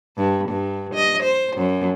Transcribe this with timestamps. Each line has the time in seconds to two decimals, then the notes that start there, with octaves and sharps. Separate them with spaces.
0.17 G2
0.49 G2
0.94 D#5
1.23 C5
1.56 F#2